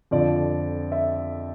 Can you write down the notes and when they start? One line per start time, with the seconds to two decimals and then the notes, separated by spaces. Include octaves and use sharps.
0.11 F2 D3 F3 D5
0.92 E5